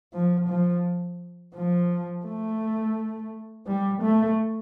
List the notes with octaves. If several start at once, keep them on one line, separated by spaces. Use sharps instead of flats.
F3
F3
F3
A3
G3
A3